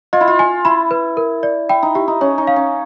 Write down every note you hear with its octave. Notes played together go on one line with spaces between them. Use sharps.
F4 D#5
E4
F4
G#5
E4 B5
B4
A#4
D5
E4 G5
D#4
E4 G4
D#4
C#4 C#5
D#4
F5
C#4